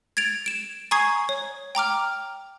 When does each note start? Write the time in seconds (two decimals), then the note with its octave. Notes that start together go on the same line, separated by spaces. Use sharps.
0.17 G#6 A6 D7 F7
0.46 D7 E7
0.91 G#5 A#5 C#6 D#6 G#6 C7
1.29 C#5
1.75 G5 A#5 D6 F6